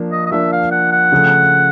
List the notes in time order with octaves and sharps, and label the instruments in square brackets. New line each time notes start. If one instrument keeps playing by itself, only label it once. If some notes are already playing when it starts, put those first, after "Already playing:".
Already playing: [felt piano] F3 A#3 D4
[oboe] D#5
D#5
[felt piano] F3 A#3 D4 [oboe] E5
[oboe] F5
F#5
F#5
[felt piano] C#3 F3 A3